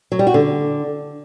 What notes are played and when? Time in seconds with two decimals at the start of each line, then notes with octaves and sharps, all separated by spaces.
0.12 F#3
0.19 G3
0.27 F#4
0.34 D3